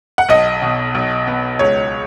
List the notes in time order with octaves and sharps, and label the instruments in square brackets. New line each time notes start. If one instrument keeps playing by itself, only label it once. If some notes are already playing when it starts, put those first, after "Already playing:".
[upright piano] F#5
B1 D#5
B2
B1
B3
C#2 C#5